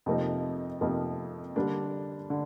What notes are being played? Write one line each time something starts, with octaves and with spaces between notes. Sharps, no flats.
F2 C3 F3 A#3 D#4
F2 C3 F3 A#3 D#4
D3 G3 A#3 D4
D3